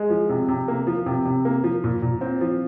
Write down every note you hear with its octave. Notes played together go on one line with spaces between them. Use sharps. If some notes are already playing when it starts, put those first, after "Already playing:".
Already playing: G#3
F3
C3
C3
A#3
F3
C3
C3
A#3
F3
A#2
A#2
C4
F3